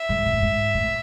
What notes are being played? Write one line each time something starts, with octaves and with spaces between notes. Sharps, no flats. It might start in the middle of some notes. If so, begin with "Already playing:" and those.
Already playing: E5
G#2
B2
A2
G#2
A2